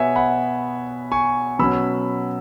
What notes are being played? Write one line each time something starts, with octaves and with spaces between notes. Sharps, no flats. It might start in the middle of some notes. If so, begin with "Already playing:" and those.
Already playing: B2 B3 C#5 E5 G#5
F#5 B5
G#5 C#6
B2 F#3 C#4 B5 E6